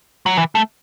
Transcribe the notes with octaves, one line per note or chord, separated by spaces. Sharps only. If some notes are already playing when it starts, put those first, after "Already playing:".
F#3
E3
A3